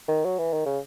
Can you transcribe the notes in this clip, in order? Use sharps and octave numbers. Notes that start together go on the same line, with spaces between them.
D#3
F#3
E3
D#3
C#3